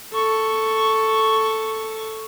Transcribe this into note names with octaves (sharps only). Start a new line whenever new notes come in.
A4 C#6